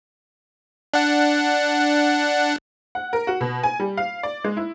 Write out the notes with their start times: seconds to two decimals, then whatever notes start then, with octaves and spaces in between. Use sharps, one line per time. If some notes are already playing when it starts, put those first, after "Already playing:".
0.94 D4 F#5
2.95 F#5
3.13 A#4
3.27 F#4
3.41 B2
3.63 G#5
3.80 G3
3.97 F5
4.23 D5
4.44 G#3
4.57 E4